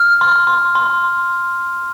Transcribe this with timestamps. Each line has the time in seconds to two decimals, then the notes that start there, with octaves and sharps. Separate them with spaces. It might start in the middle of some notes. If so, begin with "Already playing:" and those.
Already playing: F6
0.21 C6
0.47 C6
0.75 C6